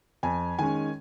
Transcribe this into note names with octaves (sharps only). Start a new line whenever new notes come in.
F2 G#5
D#3 G#3 C#4 G#5